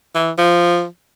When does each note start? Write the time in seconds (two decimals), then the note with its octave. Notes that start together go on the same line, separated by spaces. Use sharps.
0.15 E3
0.38 F3